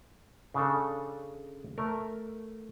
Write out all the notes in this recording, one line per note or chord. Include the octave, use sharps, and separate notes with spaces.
C#3 D4 A4
A3 A#4